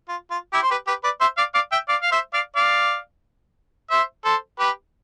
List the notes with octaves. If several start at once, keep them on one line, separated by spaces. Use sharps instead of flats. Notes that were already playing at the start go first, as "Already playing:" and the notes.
F4
F4
E4 G4
C5
G4 B4
G4 B4
B4 D5
C5 E5
D5 F5
D5 F5
E5 G5
D5 F5
F5
C5 E5
D5 F5
D5 F5
C5 E5
A4 C5
G4 B4